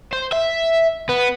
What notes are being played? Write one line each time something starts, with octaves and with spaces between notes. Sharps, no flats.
C5
E5
B3